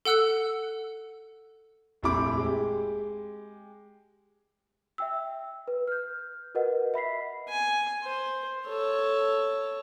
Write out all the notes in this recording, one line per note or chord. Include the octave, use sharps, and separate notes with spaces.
A4 F#5 E6 F#6 C#7
F1 A#1 C4 E4 B5 D6
G#3 G4
E5 G5 E6
B4
F6 G6
F#4 A#4 B4 D#5 F#5
E5 B5 B6 C7
G#5
C5
A4 C#5